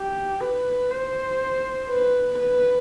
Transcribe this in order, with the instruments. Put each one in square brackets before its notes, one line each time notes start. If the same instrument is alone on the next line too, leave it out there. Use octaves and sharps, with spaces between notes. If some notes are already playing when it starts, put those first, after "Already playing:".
Already playing: [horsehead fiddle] G4
B4
C5
B4
B4